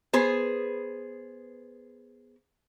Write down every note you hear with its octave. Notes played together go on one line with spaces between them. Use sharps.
B3 G#4 C5